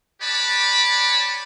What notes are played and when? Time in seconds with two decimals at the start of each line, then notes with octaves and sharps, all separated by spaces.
0.21 G4 B4 C#5 D5 A5 B5